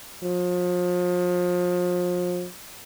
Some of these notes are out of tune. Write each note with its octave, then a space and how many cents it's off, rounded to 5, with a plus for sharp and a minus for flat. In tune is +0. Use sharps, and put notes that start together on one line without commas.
F3 +35